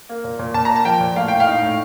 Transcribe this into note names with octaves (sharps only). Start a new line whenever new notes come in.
A#3
A#2
A#2
A#2 A5
A#3 A#5
A5
F3 G5
A#2
A2 F5
A2 G5
F5
D#4
A2